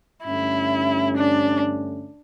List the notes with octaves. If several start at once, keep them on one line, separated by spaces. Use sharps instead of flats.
G2 D3 A3 C#4 E4
D4